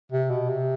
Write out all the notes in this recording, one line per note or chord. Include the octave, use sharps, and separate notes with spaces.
C3
B2
C3